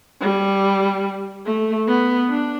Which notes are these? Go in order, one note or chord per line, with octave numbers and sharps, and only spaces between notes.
G3
A3
B3
D4